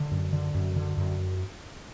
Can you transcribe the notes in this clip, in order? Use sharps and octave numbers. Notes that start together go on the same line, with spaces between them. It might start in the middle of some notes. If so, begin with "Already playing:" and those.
Already playing: D3
F#2
D3
F#2
D3
F#2